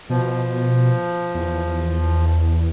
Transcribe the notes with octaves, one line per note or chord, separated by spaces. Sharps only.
B2 F3
E2